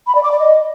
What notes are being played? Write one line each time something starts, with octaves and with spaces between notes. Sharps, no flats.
B5
D5
D6
D5
D#5